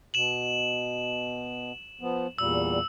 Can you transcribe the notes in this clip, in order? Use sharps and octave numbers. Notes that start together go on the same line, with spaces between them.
B2 E7 F#7
F3 B3
E2 A#2 G3 E6